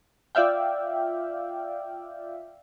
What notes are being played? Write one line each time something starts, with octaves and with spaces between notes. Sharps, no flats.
F4 D5 E5 F5 G5